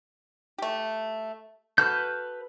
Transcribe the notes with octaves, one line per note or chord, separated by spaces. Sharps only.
A3 G4
F#4 A4 B4 F6 G6